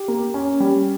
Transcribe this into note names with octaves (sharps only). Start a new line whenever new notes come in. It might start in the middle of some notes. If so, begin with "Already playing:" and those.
Already playing: G4
A#3
C#4
G3